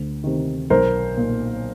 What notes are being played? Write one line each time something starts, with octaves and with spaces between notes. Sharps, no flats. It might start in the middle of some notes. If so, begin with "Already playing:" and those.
Already playing: D2
C3 D#3
B1 A#4 C5
A#2